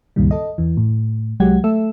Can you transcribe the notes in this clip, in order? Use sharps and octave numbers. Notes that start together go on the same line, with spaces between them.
C#2 G2 A#2 D#3 G3
A4 D#5
E2 E3
A2
C2 F#3 G#3 G4 F#5 G#6
A3 A4 E5 E6